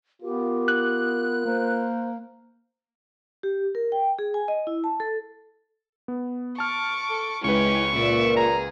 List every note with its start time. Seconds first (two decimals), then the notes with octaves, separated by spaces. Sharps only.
0.22 B3 F4 G4 A#4
0.68 F#6
1.45 A#3 C5
3.43 G4
3.75 A#4
3.92 G5
4.19 G#4
4.34 G#5
4.48 D#5
4.67 E4
4.84 A5
5.00 A4
6.08 B3
6.58 A5 C#6 D6 F6
7.10 A4
7.44 C#2 G#3 C#4 E4 G4 B4 C#6
7.95 A#2 D5 E5
8.37 G#4 A#5